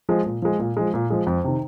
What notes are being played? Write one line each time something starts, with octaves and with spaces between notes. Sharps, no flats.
F3 G#3
A#2
F3 G#3
A#2
F3 G#3
A#2
F3 G#3
F2
C3 D#3